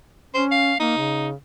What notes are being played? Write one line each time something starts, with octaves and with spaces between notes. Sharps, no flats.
C#4 C5
F5
A#3 D#4
C#3